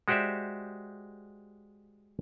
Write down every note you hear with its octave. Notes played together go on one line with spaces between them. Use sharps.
G#3 F#4 G4 C5 D5 E5